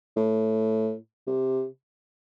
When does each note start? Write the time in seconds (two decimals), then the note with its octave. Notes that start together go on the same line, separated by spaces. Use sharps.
0.16 A2
1.27 C3